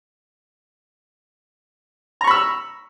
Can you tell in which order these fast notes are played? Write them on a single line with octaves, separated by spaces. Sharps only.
A#5 C#6 B5 E6